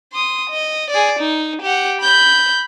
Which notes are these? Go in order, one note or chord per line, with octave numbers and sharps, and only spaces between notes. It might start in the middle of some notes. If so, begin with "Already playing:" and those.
C6 D#6
D#5
G#4 D5
D#4
G4 F#5
B5 G6